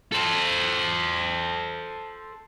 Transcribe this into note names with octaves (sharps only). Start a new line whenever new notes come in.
A4 C5